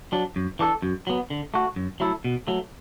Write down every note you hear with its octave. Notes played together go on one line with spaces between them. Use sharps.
F#3 D4
F#2
E3 D4 F#4 A4
F#2
F#3 B3
D3
A3 F#4
F#2
F#3 A3 E4 A4
B2
F#3 A3